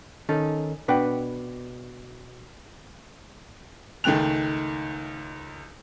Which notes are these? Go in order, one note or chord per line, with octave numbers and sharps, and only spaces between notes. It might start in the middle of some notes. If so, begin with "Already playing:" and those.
D#3 C#4 D#4 A4
B2 D4 B4 F#5 G5
C#2 D#3 A3 G5 F#6 F7